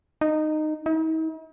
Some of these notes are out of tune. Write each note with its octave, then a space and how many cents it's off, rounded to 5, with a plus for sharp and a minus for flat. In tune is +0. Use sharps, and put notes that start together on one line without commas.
D#4 -15
D#4 +45